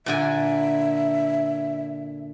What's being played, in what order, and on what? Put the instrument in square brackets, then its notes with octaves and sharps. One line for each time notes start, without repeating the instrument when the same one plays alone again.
[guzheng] A#2 D3 G#5 [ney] E5